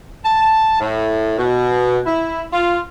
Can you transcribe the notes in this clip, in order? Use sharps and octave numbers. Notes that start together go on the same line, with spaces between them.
A5
A2
B2
E4
F4